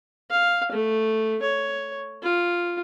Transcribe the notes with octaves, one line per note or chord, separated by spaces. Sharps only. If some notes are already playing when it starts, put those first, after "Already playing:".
F5
A3
C#5
F4